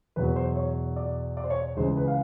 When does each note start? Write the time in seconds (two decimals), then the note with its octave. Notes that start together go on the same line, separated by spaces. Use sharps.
0.16 E2 B2 F#3 B4
0.36 C5
0.56 C#5
0.96 D5
1.37 D5
1.44 C5
1.50 C#5
1.77 C#2 C#3 E3 G#3 C5
1.97 B4
2.08 F5